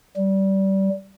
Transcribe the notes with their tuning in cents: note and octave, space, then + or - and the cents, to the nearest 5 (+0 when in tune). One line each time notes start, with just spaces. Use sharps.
G3 -20